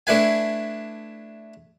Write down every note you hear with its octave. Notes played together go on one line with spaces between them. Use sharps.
A3 D4 E4 B4 G#5